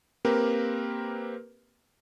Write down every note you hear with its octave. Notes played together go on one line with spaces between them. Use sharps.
A#3 C4 G4 A#4 B4